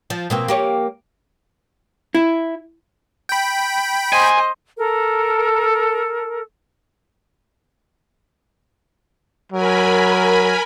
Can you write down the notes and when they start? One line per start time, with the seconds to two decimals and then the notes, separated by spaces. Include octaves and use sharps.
0.10 F3
0.30 B2 A#3 C4
0.48 A#3 G4 C#5
2.15 E4
3.29 G5 B5
4.13 C5 D#5 G#5
4.78 A4 A#4
9.52 F#3 A#4 G#5 B5